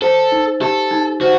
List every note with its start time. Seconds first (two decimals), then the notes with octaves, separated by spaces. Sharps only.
0.02 A4 C5
0.32 D#4
0.61 G4 A4
0.91 D#4
1.21 F#4 C5